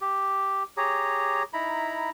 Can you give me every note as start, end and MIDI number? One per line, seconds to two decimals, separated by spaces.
0.01 0.63 67
0.77 1.43 67
0.77 1.43 68
0.77 1.43 73
0.77 1.43 82
1.53 2.10 63
1.53 2.10 64
1.53 2.10 82
1.53 2.10 83